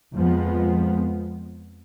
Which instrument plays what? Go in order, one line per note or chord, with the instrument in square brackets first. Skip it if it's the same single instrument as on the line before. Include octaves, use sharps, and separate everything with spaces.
[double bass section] F2 F3 G#3 B3